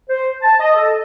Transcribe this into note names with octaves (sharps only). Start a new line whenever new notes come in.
C5
A5
D#5
A4